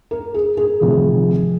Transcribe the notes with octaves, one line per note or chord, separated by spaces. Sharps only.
A#4
G#4
G#4
F1 F2 C3 D#3